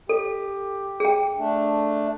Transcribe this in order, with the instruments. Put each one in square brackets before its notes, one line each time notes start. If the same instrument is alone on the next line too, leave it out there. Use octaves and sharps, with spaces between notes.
[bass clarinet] G4 [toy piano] A4
[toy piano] G#4 G5
[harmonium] A3 D4